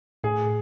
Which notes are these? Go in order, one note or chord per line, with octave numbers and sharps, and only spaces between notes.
A2 G#4